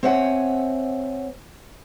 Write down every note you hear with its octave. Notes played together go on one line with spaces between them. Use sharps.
C4 C#5 E5 F#5 G#5